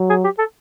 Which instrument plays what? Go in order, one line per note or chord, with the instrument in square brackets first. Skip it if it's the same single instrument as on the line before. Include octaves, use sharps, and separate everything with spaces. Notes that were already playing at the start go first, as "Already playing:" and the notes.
Already playing: [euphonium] F#3
[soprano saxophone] G#4
G4
A4